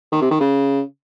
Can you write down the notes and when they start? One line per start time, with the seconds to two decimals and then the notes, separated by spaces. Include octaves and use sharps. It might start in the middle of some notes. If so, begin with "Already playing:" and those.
0.12 D#3
0.22 C3
0.31 D#3
0.40 C#3